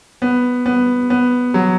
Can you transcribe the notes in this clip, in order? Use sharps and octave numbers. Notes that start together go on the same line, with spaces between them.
B3
B3
B3
F#3